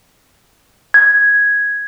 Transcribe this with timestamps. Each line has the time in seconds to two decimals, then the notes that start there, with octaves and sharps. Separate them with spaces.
0.94 G#6